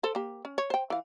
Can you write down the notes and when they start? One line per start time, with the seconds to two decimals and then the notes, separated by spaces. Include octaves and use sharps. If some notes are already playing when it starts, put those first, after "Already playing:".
0.03 A4 C5
0.15 A#3 G4
0.45 C#4
0.58 C#5
0.70 C5 G5
0.90 E3 F5